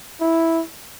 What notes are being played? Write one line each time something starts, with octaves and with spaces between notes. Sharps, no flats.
E4